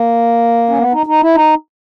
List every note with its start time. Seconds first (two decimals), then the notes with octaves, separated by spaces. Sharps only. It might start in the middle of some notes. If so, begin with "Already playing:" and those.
Already playing: A#3
0.69 C#4
0.78 B3
0.93 D#4
1.06 D#4
1.21 E4
1.35 D#4